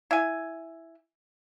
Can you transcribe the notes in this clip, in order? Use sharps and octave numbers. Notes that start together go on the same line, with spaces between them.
E4 G#5